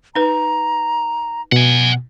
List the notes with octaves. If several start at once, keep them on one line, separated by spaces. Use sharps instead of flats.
D#4 B4 A#5
B2 F#5 G#5